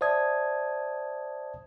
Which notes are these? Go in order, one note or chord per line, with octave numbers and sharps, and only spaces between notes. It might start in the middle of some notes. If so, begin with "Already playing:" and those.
C5 D5 E5 A5 D#6 G#6